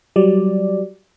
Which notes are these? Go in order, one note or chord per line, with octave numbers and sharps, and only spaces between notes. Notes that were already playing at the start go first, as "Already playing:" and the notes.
F#3 G3 D5